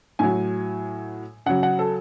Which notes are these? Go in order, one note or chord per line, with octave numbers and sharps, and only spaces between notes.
A2 F#3 G#5
C#3 F#3 F#5
F#5
A4